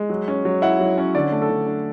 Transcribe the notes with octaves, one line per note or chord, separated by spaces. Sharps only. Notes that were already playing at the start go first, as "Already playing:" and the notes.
Already playing: G#3
F#3
C#4
F#3
E4 F#5
F#3
C#4
D3 D5
A3
A4
D3
D4